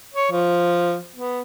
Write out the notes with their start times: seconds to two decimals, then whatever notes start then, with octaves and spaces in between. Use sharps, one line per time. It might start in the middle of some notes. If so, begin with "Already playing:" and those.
0.14 C#5
0.32 F3
1.16 B3